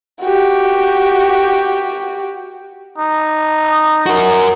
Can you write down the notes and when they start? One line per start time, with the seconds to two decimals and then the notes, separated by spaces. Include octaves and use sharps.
0.22 F#4 G4
2.98 D#4
4.06 F#4 A#4